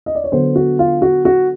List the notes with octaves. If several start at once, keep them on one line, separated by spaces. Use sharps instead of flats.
D#5
D5
C#5
D3 F#3 B3 C5
F#4
F4
F#4
F#4